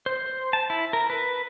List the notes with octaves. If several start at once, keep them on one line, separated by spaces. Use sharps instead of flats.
C5
A5
E4
A#4
B4